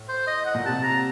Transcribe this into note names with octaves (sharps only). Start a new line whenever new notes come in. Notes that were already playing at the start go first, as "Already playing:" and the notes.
Already playing: A2
C5
D#5
F#5
A#2
C3 A5
A#5